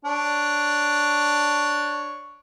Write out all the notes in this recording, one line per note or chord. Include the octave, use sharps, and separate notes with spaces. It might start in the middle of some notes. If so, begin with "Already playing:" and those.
D4 C#5